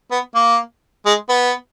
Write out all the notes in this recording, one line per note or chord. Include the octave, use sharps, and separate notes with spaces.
B3
A#3
G#3
B3